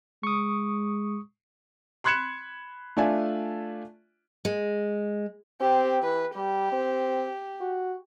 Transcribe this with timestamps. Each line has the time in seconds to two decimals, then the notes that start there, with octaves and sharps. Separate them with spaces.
0.23 G#3 C#6 D#6
2.04 B5 C6 F#6 G#6 C#7 E7
2.97 A3 D4 F4 D5 E5 G#5
4.45 G#3
5.61 C4 G4
6.02 E3 B4
6.36 G3 G4
6.72 C4
7.61 F#4